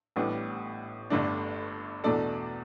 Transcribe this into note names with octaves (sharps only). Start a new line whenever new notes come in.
A1 A2 G3 B3 D4
G1 G2 D3 A3 D4
E2 B2 A3 D4 A4 D5